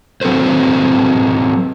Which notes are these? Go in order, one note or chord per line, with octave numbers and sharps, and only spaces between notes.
F#3 C4 A4 B4 C5